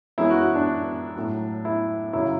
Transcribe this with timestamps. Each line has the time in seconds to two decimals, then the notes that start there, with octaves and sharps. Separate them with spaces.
0.18 F#2 E3 G#3 E4
0.30 F#4
0.42 F#4
0.55 D4
1.15 A2 F#3
1.65 E4
2.13 F#2 C#3 F#3 E4